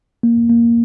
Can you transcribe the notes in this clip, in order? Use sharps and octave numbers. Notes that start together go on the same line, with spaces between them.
A#3
A#3